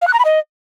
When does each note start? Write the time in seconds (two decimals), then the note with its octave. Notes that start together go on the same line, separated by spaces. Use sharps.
0.02 F5
0.08 F#6
0.13 A#5
0.19 B5
0.25 D#5